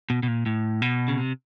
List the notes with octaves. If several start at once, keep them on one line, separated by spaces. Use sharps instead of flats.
B2
B2
A#2
A2
B2
C#3
C3